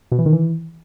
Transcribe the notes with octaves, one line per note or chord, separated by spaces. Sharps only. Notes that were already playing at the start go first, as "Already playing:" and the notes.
B2
E3
D#3
E3